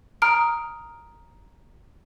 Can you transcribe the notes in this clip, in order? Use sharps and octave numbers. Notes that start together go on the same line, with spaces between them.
A#5 D#6 F6 D7